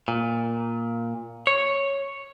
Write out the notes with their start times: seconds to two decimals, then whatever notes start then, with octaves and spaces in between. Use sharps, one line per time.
0.08 A#2
1.47 C#5